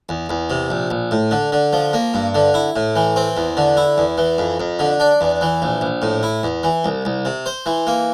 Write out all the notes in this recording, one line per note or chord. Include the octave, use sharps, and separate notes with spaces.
E2
E2
C3
A#1
A#1
A2
D3
D3
F3
A#3
G2
D3
E4
A2
E3
C4
E2
D3
E4
E2
E3
F2
F2
D3
D4
E2
E3
A#1
A#1
A2
E4
E2
E3
C2
C2
C3
C5
E3
A#3